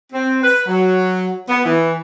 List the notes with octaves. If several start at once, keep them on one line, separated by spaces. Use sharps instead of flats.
C4
B4
F#3
B3
E3